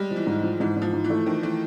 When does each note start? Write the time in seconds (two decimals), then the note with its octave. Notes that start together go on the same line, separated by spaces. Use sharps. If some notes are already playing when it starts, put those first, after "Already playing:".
Already playing: G3 G#3
0.11 F3
0.16 E3
0.26 G#2
0.43 F3
0.60 G#2 E3
0.76 G#2
0.82 F3
0.93 G#2
1.04 E3
1.10 A3
1.26 D#3 F3
1.43 E3 A3